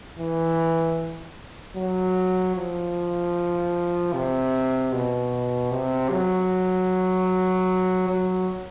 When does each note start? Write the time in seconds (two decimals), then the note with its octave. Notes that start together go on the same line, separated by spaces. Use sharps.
0.19 E3
1.76 F#3
2.56 F3
4.13 C3
4.92 B2
5.71 C3
6.10 F#3
8.08 F#3